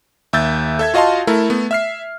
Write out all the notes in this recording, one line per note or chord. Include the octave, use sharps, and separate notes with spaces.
D#2 E5 E6 G6 A6
A4 E5 G#6
F4 F#4 D#5 F5 A5 C6
A3 E4 A4 A#4
A3 B3
E5 F6 C7